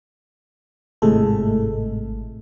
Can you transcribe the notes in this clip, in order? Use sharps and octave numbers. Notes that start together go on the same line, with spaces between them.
G#1 A2 C3 G#3 A3 A4